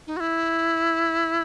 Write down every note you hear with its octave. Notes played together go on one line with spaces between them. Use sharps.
D#4
F#4
E4